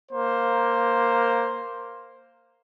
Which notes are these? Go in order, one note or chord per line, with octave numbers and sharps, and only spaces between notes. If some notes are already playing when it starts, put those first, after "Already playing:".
A#3 C5